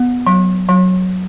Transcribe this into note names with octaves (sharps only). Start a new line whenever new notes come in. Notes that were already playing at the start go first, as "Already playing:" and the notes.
Already playing: B3
F#3
F#3